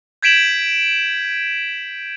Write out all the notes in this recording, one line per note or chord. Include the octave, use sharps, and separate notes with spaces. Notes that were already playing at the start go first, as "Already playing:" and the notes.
G6 G#6 B6 D7 E7 F#7